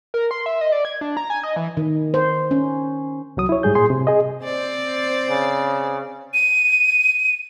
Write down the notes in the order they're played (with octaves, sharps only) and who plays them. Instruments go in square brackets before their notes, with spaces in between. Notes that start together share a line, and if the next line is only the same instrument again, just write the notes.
[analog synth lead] A#4
C6
E5
D#5
D5
G#6
D4
A#5
G#5
D#5
E3
[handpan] D#3
C5
C#4
[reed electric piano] C2 F#3 D#6
E4 C#5
G#2 G3 G#4 G6
A#2 G#4 C6
C3
G#4 D#5
[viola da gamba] C4 C5 D5
[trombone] C#3
[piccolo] D#7